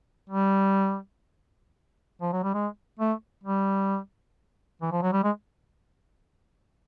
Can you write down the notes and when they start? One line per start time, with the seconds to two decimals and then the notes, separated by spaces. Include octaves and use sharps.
0.30 G3
2.21 F3
2.33 F#3
2.43 G3
2.54 G#3
2.99 A3
3.44 G3
4.82 E3
4.92 F3
5.02 F#3
5.13 G3
5.24 G#3